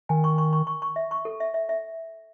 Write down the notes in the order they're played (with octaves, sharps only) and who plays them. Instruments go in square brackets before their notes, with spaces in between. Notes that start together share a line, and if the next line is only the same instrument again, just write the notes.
[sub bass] D#3 [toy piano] G#5
[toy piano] C#6
C#6
C#6
C#6
C#6
E5
C#6
A4
E5
E5
E5